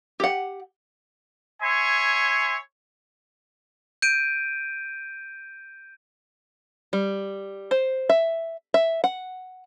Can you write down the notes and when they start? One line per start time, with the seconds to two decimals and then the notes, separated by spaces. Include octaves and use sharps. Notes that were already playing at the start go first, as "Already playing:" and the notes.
0.20 G4 F#5
1.61 C#5 E5 G#5 C6
4.02 G6 D7 D#7
6.93 G3
7.71 C5
8.09 E5
8.74 E5
9.04 F#5